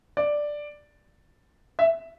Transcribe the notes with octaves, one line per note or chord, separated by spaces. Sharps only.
D5
E5